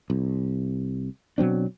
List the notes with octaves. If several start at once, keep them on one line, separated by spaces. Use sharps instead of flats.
C2
B2 F#3 C4 D4